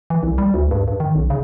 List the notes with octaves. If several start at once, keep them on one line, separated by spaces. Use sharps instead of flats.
E3
C2
G3
D2
G2
G2
D#3
B1
C#3